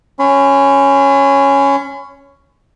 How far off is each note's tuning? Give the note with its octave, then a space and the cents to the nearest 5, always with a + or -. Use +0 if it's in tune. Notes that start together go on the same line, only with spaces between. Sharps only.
C#4 +0 B5 +40